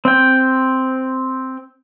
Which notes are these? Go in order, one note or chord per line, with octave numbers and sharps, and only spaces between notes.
C4 G5